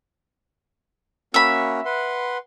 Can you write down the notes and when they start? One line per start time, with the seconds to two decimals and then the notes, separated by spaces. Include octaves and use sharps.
1.34 A#3 C#4 F#4 E5 B5
1.85 B4 F#5 C6